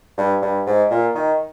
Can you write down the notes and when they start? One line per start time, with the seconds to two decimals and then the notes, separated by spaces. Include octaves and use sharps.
0.18 G2
0.42 G2
0.67 G#2
0.91 A#2
1.15 D#3